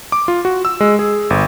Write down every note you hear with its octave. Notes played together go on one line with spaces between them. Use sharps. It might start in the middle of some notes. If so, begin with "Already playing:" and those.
D6
F4
F#4
E6
G#3
G#4
G1